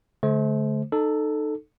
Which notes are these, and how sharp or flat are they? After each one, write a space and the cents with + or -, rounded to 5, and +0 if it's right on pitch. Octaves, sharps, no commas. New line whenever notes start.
D3 -35 A3 -40 C5 +0
D#4 -25 A4 +0